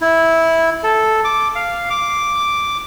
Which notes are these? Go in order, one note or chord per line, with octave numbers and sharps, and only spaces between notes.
E4
A4
D6
F5
D6